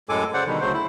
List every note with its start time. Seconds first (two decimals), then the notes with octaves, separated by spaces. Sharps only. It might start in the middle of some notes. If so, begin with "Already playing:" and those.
0.09 F#2 A2 G#3 A4 G#5 D6
0.34 C#3 C5 D5 F#5
0.46 B2 D3 D#3 G3
0.61 D2 C#3 F#3 A3 C5
0.73 E4